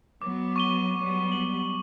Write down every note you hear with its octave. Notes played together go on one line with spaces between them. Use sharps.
F#3 B3 D6
C#6 D#7 G7
F#3 G3 B3
F#7